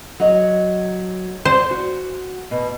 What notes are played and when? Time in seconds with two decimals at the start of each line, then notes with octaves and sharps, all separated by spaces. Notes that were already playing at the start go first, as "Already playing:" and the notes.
0.20 F#3 D#5
1.45 C5 D5
1.71 F#4
2.51 B2